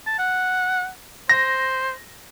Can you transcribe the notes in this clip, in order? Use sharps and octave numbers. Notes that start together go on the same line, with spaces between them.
A5
F#5
C5 A#6